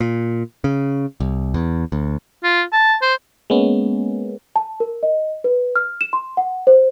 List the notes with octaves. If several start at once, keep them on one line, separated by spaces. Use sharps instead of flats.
A#2
C#3
C2
E2
D2
F4
A5
C5
G#3 A#3 B3 C#4
A5
A#4
D#5
B4
F6
E7
C6
F#5
C5